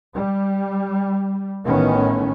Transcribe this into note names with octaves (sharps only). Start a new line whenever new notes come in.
G3
A1 A2 D#3 B3 C#4